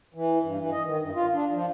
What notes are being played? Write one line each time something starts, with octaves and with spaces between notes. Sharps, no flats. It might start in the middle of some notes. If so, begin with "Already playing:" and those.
E3
G2
E3
D#5
D#3
G2
F4
D4
F3